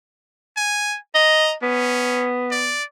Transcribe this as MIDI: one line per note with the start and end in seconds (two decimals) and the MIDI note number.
0.57 0.97 80
1.15 1.53 75
1.15 1.54 82
1.63 2.76 59
1.63 2.29 61
2.51 2.84 74